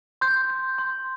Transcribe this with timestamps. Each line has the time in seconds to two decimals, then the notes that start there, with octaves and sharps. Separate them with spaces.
0.21 C6 G6
0.50 G6
0.78 C6